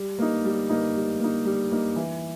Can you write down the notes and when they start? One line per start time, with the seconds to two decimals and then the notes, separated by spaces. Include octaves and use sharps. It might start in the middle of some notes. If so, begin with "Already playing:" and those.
Already playing: G3
0.19 A#3 D#4
0.45 G3
0.69 A#3 D#4
0.96 G3
1.20 A#3 D#4
1.45 G3
1.71 A#3 D#4
1.96 E3